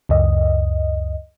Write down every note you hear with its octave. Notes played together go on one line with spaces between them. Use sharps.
C#2 F#2 D#5